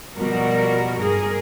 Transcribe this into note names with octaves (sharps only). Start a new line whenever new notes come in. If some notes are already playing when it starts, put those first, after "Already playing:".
B2 F3 G3 F#4 A#4
G2 G#4 A#4